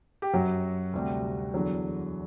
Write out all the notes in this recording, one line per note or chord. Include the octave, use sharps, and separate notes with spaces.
G4
F#2 F#3 F#4
D2 C3 G3
E2 D3 F#3